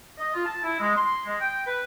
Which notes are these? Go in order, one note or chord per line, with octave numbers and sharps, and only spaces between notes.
D#5
F4
A5
E4
G#3
C6
G#3
G5
B4